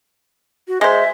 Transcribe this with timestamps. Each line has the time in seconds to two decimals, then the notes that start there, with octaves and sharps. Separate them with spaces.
0.68 F#4
0.81 G#3 C5 E5